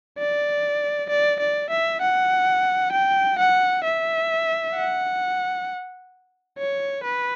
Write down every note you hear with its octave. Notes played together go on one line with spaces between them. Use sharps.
D5
D5
D5
E5
F#5
G5
F#5
E5
F#5
C#5
B4